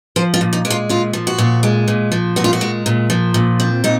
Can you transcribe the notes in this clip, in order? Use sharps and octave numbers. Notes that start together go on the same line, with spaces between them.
F3 C5
F4
A#2
D#4
G#3
F4
A#2 F4
F3
F#4
A#2
G#3
A#2
F3
A#2 F#4
F4
F#4
G#3
A#2
F3
A#2
C4
A#2 D#4